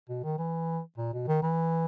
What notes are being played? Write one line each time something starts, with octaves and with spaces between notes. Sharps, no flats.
B2
D#3
E3
A#2
B2
D#3
E3